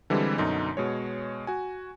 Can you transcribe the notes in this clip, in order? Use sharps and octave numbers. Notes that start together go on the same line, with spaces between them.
D3 E3 G3 G#3 C4
F#2 B2 D3 D#4
B2 G#3 C#5
F#4 G#5